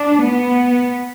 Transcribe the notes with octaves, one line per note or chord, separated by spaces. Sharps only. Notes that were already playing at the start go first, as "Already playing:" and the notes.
Already playing: D4
B3